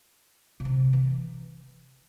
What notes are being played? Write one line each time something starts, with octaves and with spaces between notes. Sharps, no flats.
C#3
C3
E3